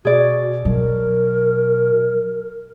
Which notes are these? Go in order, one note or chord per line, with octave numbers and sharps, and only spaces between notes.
B2 F#4 G#4 D5
B2 F#3 A#4